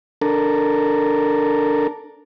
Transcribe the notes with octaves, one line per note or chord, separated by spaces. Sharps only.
D4 A4 A#4